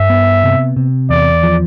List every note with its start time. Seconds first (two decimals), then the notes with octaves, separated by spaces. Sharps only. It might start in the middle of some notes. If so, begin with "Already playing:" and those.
Already playing: G2 E5
0.10 B3
0.44 C3
0.77 C3
1.10 E2 D5
1.43 F3